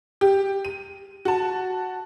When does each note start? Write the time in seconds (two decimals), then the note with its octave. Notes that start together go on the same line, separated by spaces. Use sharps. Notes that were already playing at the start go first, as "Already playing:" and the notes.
0.21 G4
0.65 D#7
1.25 F#4 A5